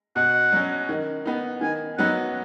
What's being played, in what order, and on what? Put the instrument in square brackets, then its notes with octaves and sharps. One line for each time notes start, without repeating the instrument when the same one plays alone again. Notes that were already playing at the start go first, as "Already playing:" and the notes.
[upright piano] B2 [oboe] F#5
[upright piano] F#3 C#4
D#3
B3 D#4
[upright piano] D#3 [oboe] G#5
[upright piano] F#3 B3 D#4 [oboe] F#5